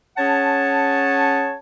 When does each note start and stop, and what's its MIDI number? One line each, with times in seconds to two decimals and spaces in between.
0.17 1.55 61
0.17 1.55 68
0.17 1.55 73
0.17 1.55 78
0.17 1.55 81